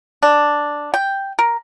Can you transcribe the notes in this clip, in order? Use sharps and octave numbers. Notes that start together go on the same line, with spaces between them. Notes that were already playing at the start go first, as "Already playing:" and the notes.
D4
G5
A#4